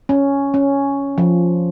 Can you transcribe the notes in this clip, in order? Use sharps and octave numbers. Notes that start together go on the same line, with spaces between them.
C#4
C#4
F3